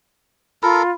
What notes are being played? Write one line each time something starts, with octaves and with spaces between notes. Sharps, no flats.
F4 A4 A#4 B5